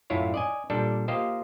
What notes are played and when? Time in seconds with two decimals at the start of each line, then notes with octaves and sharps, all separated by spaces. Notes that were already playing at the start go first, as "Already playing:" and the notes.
0.10 F#2 A2 E4 F4 C#5
0.34 D5 D#5 G#5
0.70 A#2 G3 D4 A4
1.08 A#3 F4 G4 C5 D#5